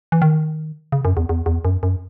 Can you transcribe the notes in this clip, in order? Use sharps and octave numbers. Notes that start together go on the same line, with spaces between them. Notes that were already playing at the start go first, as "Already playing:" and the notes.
E3
D#3
C#3
F#2
E2
E2
E2
F#2
F#2